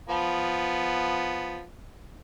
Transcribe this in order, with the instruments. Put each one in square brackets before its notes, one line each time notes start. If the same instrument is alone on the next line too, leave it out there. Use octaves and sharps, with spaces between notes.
[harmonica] F3 B3